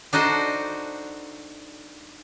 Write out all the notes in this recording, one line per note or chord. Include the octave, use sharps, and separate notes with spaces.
D4 D#4 F#4 A4 C5